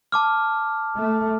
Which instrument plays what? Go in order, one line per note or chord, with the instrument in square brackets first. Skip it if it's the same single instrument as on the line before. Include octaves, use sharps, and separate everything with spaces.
[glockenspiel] A5 D6 F6
[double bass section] A3